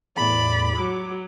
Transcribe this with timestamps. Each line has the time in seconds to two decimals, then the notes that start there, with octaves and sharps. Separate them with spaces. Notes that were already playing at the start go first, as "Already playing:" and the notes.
0.16 E2 A2 D5 B5
0.77 F#3 D6